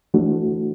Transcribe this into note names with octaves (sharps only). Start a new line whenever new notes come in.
E3 A3 D4 F#4